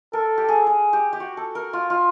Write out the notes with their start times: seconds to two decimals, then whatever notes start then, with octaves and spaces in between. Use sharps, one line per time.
0.13 A4 A#4
0.38 G4
0.49 G#4
0.67 G#4
0.93 G4
1.13 G4
1.20 F#4
1.37 A4
1.55 A#4
1.73 F4
1.90 F4